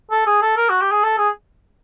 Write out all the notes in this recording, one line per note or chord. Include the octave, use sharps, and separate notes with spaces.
A4
G#4
A4
A#4
F#4
G4
G#4
A4
G#4